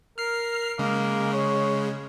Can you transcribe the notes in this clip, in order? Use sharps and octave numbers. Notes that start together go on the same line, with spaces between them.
A#4 F6 C7
C#3 G#3 A#3
C#5